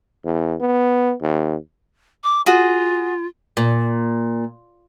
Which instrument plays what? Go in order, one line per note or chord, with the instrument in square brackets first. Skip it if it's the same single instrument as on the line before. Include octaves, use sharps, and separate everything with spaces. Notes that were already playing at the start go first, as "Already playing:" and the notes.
[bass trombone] E2
B3
D#2
[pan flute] D6
[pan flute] F4 [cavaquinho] F#4 G#4
[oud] A#2